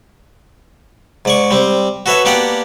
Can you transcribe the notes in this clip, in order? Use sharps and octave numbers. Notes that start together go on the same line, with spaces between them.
G#2 D5 C#6
G3 C4
F#4 A4 B4 C#5 E5
A#3 B3 D4 G4 D5 F#5